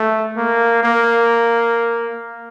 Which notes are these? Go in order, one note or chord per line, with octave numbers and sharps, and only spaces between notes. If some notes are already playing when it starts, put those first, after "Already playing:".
Already playing: A3
A#3
A#3